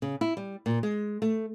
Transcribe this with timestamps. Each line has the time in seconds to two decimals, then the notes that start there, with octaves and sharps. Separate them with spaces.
0.02 C#3
0.21 E4
0.37 G3
0.66 A#2
0.83 G#3
1.22 A3